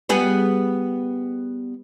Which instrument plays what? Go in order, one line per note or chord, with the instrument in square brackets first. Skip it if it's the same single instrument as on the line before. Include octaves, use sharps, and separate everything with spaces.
[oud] G3 B3 G#4